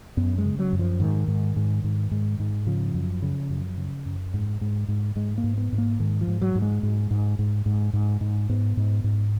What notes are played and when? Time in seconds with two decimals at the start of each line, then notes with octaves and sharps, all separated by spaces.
0.17 F#2 B3
0.38 G#3
0.45 C#3
0.59 F#3
0.73 F#2
0.79 F3
1.00 G#2 D#3
1.28 G#2
1.56 G#2
1.84 G#2
2.11 G#2
2.40 G#2
2.67 C#3 F3
2.94 F#2
3.22 C#3
3.50 F#2
3.77 C#3
4.06 F#2
4.34 G#2
4.61 G#2
4.88 G#2
5.16 G#2 G#3
5.38 A#3
5.44 G#2
5.58 B3
5.72 G#2
5.78 A#3
6.00 G#2 D#3
6.21 F3
6.27 G#2
6.41 F#3
6.55 G#2
6.62 G#3
6.83 G#2
7.11 G#2
7.39 G#2
7.66 G#2
7.93 G#2
8.21 G#2
8.49 G#2 B3
8.77 G#2
9.04 G#2